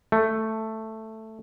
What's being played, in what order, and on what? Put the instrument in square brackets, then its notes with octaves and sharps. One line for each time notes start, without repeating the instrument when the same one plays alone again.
[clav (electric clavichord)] A3